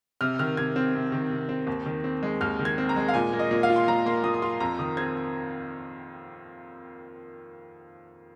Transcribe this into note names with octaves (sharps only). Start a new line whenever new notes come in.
C3 F6
D#3 F6
C3 G#6
C4
C3
D#3
C3
C4
D#2
D#3
C4
G#3
D#2 F6
D#3
G#6
C4
A#5
G#3
F5
A#2 G#5
A#3
D#5
A#2
F5
F4
C6
A#2 A#5
A#3 C6
A#2 D#6
D#6
F4 C6
F2 A#5
D#3 D#6
C4 G#6